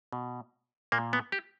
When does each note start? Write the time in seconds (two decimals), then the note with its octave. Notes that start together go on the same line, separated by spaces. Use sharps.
0.13 B2
0.92 A#2 A#3
1.13 B3
1.32 G4